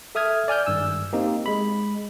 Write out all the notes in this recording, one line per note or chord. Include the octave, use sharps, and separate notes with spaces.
A4 E5 D#6 F6 G#6
D5 G#5 F6 G6
G#1 G2 E6
A#3 C4 D#4 G4
G#3 B5